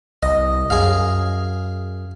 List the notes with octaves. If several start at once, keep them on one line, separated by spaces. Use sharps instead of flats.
C2 D#5
F#2 G#4 F5